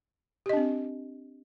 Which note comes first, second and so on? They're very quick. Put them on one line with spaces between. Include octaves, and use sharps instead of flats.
G4 D#5 D4 C4